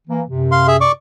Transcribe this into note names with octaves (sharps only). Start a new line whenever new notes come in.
E3 A#3
F#2 C3
F5 C6
G#4 E5
D5 C#6 D6